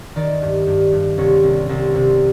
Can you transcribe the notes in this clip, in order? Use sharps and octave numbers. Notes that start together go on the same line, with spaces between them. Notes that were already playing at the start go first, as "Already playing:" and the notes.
D#3 D5
G2
G2
G2
C2 C#5
C2
C2
C3